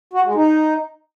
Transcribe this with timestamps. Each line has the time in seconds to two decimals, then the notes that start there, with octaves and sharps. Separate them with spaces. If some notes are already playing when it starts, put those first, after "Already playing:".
0.13 F#4
0.24 G#3
0.35 D#4